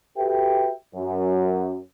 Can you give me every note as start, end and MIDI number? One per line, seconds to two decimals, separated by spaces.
0.18 0.71 66
0.18 0.71 67
0.18 0.71 69
0.18 0.71 71
0.18 0.71 76
0.18 0.71 79
0.95 1.78 42